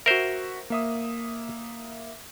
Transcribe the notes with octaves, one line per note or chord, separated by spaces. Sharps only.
F#4 A#4 C5 E5
A#3 E5 D#6